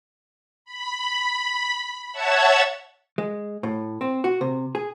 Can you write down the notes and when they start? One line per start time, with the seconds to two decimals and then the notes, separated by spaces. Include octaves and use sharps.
0.65 B5
2.12 C#5 E5 F#5 A5 E6 G#6
3.18 G#3
3.63 A2
4.01 C4
4.24 F#4
4.41 C3
4.75 G#4